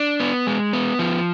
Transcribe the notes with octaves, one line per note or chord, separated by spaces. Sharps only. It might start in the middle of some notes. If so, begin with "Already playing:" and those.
Already playing: D4
B3
G#3
B3
F3